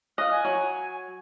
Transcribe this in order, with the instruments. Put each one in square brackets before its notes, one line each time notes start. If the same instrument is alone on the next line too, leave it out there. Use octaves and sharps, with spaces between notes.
[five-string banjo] D#5 F5 [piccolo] F#6
[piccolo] G#5
[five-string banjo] F#3